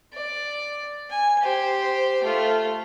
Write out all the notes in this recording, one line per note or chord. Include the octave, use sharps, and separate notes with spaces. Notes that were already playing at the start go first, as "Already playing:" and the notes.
D5
G#5
G4 C5
A3 F4